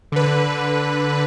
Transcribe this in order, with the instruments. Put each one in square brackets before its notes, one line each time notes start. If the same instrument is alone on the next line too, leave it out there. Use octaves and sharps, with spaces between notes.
[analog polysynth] D3 B4